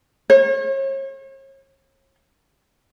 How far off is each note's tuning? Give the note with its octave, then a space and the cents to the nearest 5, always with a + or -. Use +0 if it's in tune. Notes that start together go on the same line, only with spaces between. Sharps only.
C#5 -40